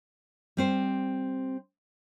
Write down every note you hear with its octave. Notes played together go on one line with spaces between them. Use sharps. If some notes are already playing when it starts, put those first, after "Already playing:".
G3 C4 C5